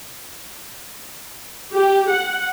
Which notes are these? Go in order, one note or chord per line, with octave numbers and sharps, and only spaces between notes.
G4
F#5